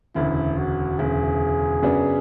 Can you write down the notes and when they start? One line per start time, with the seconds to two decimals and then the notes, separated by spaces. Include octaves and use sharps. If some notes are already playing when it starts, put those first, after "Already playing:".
0.15 E1 D2 C#3 E4
0.57 F#4
0.99 E1 D2 C#3 G#4
1.82 F#2 C#3 F#3 B3 D4